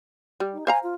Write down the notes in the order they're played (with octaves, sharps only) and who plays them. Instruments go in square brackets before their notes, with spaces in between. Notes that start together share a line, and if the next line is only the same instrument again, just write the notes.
[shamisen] G3
[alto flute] D#4
[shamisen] C5 F5 A#5 [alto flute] G#5
[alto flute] F4